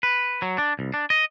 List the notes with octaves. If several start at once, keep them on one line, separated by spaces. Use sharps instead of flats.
B4
F#3
D4
C2
D4
D#5